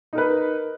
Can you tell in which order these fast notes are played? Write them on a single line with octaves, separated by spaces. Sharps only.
D#4 A#4 B4